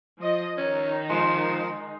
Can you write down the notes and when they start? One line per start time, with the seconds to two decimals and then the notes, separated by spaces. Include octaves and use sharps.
0.19 F3 D#5
0.57 D#3 C#4 D#4
1.09 F3 G#3 C6